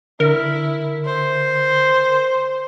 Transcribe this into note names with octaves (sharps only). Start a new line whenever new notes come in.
D3 E4 A#4
C5